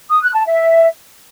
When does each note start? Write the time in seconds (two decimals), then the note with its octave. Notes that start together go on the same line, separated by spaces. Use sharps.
0.11 D#6
0.22 F#6
0.34 A5
0.46 E5